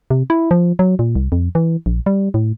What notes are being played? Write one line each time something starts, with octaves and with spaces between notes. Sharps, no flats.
C3
E4
F3
F#3
A#2
C2
F2
E3
A#1
G3
A2